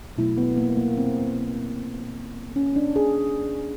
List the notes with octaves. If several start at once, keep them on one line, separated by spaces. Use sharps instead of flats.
B2 F#3 A3 E4
B3
A#3
A#3
C4
C#4
D4
G#4